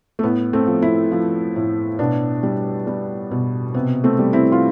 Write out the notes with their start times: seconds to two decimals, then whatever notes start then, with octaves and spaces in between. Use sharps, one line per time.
0.19 A3
0.23 A2 B3
0.53 A3 C4
0.67 F3
0.82 C4 E4
1.12 F3
1.56 A2
1.99 B2 B3 D4
2.43 G3
2.87 G3
3.31 B2
3.74 C3 B3
4.04 A3 C4
4.19 G3
4.33 C4 E4
4.52 F4